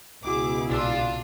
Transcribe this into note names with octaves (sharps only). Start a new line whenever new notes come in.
C#2 B2 G#3 E4 F#4 G#4 D6 E6
B1 A#2 D4 F4 E6